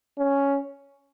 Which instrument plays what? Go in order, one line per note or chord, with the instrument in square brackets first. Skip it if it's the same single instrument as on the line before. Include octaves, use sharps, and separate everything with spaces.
[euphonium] C#4